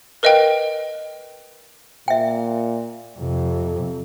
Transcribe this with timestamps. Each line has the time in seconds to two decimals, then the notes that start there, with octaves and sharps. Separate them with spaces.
0.23 A#4 B4 D#5 F5 G5
2.08 A#2 E5 G5
3.19 F2 C3